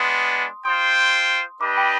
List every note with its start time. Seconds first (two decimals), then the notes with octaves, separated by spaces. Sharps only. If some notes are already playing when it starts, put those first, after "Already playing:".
Already playing: G#3 B3 D4 C6 D#6
0.65 F4 C5 G5 C6 D#6
1.60 D4 G4 B4 D#5 B5 D6
1.77 G5 B5